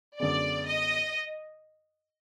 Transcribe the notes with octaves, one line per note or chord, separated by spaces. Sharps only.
F#2 D3 G#3 B3 D5
D#5